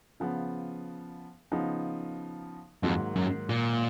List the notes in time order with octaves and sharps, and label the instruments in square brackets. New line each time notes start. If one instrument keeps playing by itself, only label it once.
[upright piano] C#3 F3 B3
C#3 F3 B3 D#4
[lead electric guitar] F2 [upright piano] G#2 D#3 F#3 A#3
[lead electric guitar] F#2
A#2